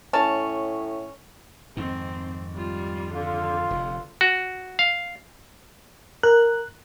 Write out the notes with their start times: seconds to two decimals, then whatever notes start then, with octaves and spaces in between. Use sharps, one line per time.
0.13 A2 C#4 A5
1.77 F2 G#2 D#3 C4
2.54 G3 F4
3.14 D3 F4
3.71 F1 C3
4.21 F#4
4.79 F5
6.23 A#4 F#6